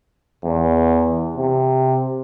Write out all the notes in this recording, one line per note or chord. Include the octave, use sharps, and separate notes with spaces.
E2
C3